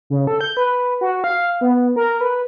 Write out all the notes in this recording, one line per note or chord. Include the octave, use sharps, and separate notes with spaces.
C#3
A4
G6
B4
F#4
F5
B3
A#4
B4